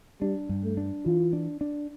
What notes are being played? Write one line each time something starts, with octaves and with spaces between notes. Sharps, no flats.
G3 D4
G2
A3
D4
E3 F4
D4
D4